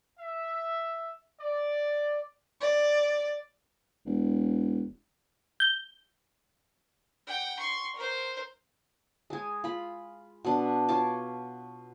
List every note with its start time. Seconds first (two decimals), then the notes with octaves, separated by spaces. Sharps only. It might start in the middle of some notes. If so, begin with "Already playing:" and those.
0.19 E5
1.40 D5
2.61 D5
4.06 E1
5.60 G6
7.27 F#5 G5
7.59 C6 C#6
7.95 A#4 C5
9.30 G#3 G#4
9.64 F4 B5
10.45 B2 D4
10.88 F4 C#5 A5 D6